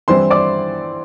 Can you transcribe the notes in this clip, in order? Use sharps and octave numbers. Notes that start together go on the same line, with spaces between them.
G2 E3 G3 C4 E4 C5 C6
D5 D6